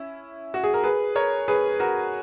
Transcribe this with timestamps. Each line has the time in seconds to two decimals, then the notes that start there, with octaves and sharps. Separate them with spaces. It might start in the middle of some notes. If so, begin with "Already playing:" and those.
Already playing: C#4 E4
0.54 F#4
0.64 G#4
0.74 A#4
0.84 G#4 B4
1.15 A#4 C#5
1.48 G#4 B4
1.80 F#4 A#4